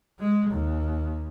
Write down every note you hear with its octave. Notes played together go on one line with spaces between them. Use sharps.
G#3
D#2